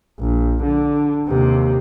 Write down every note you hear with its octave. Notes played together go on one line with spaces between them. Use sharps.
A#1
D3
D#2 C3